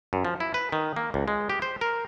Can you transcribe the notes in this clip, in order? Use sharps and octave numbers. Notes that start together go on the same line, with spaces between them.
F#2
F3
E4
B4
D#3
A#3
C#2
G#3
G4
C5
A#4